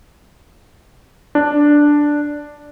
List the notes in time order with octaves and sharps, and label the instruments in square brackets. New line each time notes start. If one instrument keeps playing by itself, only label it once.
[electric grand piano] D4